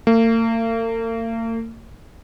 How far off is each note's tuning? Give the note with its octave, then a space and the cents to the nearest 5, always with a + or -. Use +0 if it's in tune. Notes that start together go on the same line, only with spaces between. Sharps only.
A#3 -45